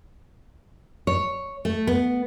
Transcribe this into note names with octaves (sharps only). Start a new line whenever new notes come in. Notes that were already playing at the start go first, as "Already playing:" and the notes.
C#5
A3
B3